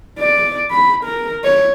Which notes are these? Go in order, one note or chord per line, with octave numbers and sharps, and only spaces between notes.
D5
B5
A#4
C#5